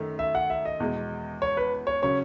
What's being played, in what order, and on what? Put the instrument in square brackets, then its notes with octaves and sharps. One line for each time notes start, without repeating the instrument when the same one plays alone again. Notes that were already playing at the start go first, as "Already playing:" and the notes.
Already playing: [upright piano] F#2 D#3 A3
[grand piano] E5
F#5
E5
D#5
[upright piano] E2 B2 G#3
[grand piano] C#5
B4
C#5
[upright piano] C#3 F#3 C#4 [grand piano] C#5